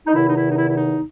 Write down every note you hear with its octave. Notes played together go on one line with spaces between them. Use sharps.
D#4
E2 C3 D#3 E4
D#4
E4
D#4
E4
E4
D#4